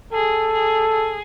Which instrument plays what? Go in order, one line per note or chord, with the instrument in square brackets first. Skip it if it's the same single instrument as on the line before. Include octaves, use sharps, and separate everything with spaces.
[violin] G#4 [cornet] A4
[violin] G#4
G#4